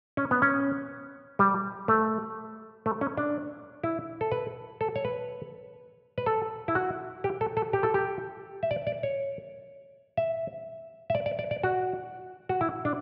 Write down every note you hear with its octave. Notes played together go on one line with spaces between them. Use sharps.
C#4
B3
C#4
G3
A3
A3
C#4
D4
E4
A4
B4
A4
C#5
B4
B4
A4
E4
F#4
G4
A4
A4
G4
A4
G4
E5
D5
D5
C#5
E5
E5
D5
D5
D5
D5
F#4
F#4
E4
D4